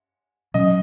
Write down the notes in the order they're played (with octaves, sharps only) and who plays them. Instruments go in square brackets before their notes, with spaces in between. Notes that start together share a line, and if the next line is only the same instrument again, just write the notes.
[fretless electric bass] B2 F#3 C#4 [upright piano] D#5